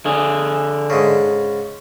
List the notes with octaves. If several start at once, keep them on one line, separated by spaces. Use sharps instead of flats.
D3 G#4
G#2 C#3